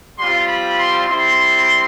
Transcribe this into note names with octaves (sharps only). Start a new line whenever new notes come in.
G3 C4 F4 C6
B5
C6
G3 C4 E4 C6